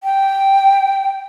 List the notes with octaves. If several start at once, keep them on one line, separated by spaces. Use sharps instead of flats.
G5